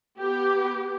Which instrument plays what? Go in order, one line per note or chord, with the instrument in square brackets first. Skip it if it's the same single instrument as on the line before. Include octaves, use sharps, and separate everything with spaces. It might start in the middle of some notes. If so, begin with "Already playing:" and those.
[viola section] B3 G4